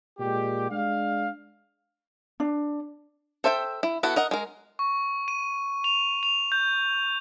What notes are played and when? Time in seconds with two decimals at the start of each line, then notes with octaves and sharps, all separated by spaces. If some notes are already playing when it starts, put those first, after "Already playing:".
0.19 A#2 G#3 G4
0.70 G#3 D4 F5
2.40 D4
3.44 A4 C5 E5 F#5 G5
3.83 E4
4.03 B3 E4 F#4 A4 F#5
4.16 A#4 D#5 F#5
4.31 G#3 A#4
4.79 C#6
5.28 D#7
5.84 F7
6.23 F7
6.52 G6